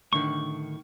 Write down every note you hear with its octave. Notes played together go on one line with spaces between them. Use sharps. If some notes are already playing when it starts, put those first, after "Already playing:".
A2 D3 D#3 C#6